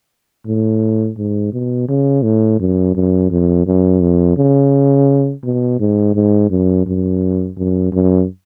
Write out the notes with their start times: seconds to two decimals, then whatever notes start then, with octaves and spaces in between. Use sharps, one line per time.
0.47 A2
1.17 G#2
1.53 B2
1.88 C#3
2.24 A2
2.59 F#2
2.95 F#2
3.31 F2
3.66 F#2
4.01 F2
4.37 C#3
5.44 B2
5.79 G#2
6.15 G#2
6.50 F#2
6.86 F#2
7.57 F#2
7.93 F#2